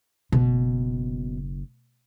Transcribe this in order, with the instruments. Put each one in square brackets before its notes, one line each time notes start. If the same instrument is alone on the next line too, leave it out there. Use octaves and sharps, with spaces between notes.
[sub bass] F#1 [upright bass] B2